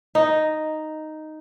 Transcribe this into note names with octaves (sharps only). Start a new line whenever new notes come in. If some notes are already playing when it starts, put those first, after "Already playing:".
D#4